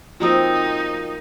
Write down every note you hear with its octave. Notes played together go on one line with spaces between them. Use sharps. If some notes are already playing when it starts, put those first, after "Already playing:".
F3 A#3 C4 D#4 F4 F#4 D#6